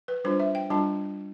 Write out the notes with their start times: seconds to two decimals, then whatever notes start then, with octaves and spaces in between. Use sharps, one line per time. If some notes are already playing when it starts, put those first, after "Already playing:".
0.08 B4
0.25 G3 D4 F4 C5
0.40 E5
0.55 G5
0.70 G3 D4 F4 A5